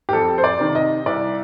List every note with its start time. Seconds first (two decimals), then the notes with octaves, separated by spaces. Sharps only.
0.09 G4
0.13 F2 A4
0.38 C5
0.44 D5
0.60 C3 D#3
0.75 D#5
1.06 C2 D5